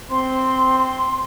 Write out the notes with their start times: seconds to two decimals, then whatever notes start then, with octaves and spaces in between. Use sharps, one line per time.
0.11 C4 C6